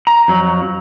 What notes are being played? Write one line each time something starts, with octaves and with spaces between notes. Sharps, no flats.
A#5
F2 F#3